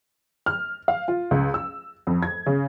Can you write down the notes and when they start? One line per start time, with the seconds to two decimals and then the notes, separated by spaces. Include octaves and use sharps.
0.46 F6
0.88 F5
1.08 F4
1.31 C#2
1.54 E6
2.07 F2
2.23 G#6
2.46 C#3